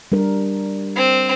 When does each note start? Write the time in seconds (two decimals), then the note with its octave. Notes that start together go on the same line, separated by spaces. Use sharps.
0.12 G3 D4 A#4
0.97 C4